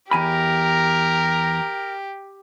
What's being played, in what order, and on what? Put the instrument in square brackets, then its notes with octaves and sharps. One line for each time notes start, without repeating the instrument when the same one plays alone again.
[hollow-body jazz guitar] E2 G#5 B5 [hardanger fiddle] G4 [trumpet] A#4 [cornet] A#5